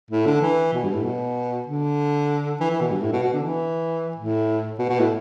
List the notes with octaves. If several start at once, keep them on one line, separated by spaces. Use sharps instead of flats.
A2
D3
E3
B2
G2
A2
B2
D3
E3
E3
B2
G2
A2
B2
B2
D3
E3
A2
B2
B2
A2